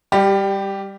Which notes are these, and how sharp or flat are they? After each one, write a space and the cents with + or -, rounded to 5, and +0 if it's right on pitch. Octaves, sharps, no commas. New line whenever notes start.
G3 +20 G4 -5